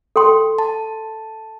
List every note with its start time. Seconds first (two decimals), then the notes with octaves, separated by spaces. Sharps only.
0.16 A4 G5 C6
0.59 A5